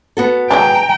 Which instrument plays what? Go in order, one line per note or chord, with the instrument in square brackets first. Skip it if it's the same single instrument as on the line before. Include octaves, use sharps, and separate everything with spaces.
[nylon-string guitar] B3 F#4 A4
[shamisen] F#3 G#3 D4 [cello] G5 [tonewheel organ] G#5 A#5